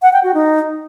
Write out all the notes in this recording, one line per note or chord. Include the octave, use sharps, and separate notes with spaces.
F#5
G5
F#4
D#4